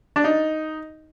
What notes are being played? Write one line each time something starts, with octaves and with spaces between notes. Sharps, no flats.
D4
D#4